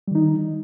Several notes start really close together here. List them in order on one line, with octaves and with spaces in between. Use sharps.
G3 D#3 D#4